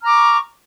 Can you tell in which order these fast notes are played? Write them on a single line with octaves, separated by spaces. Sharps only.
F6 A#5 D6 C#6